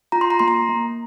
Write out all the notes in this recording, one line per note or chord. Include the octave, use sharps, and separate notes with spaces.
F4 A#5
C6
A#5
A#3 C6
A#5
A#3